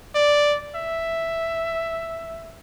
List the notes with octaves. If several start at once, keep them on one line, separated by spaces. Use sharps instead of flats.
D5
E5